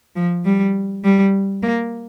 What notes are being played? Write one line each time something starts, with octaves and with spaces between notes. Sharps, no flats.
F3
G3
G3
A#3